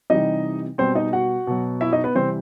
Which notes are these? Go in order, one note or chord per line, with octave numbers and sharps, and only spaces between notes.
C3 E3 G3 D#4 D#5
B2 G3 C4 C5
D#4 D#5
F#4 F#5
B2 F#3
E4 E5
D#4 D#5
B3 B4
C3 E3 G3 C4 C5